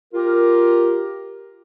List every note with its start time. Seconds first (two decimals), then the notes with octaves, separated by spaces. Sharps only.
0.14 F4 G4 A#4